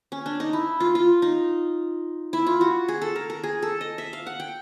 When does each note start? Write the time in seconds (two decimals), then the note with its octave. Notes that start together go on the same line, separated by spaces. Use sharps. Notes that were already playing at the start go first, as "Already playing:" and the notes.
0.12 C#4
0.26 D4
0.40 D#4
0.53 E4
0.80 F4
0.95 F4
1.22 D#4
2.33 E4
2.47 F4
2.61 F#4
2.88 G#4
3.02 A4
3.16 A#4
3.30 A#4
3.44 G#4
3.62 A4
3.81 D#5
3.98 E5
4.13 F5
4.27 F#5
4.40 G5